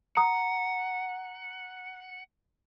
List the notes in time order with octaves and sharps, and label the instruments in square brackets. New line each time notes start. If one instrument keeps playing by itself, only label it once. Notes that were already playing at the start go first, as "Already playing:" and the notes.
[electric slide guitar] F#5 [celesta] A#5 D#6